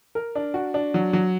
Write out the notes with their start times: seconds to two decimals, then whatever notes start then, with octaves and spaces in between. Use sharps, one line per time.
0.15 A#4
0.35 D4
0.54 F#4
0.74 D4
0.94 F#3
1.13 F#3